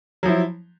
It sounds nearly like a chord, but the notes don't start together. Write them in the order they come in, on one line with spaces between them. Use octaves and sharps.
F#3 F3 E4